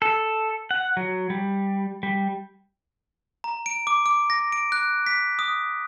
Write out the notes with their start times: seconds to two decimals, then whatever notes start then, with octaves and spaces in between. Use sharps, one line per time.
0.02 A4
0.71 F#5
0.97 F#3
1.30 G3
2.03 G3
3.44 A#5
3.66 D7
3.87 D6
4.06 D6
4.30 A#6
4.52 D7
4.72 F#6
5.06 B6
5.39 D#6